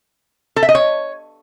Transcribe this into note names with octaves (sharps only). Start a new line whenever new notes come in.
A4
E5
D#5
C#5